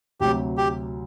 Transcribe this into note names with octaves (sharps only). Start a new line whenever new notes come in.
D2 C3 F#3 G4
G4